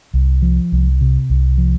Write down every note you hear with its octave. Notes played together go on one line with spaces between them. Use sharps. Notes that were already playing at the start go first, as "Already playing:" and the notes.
C2
F3
C2
C3
C2
F3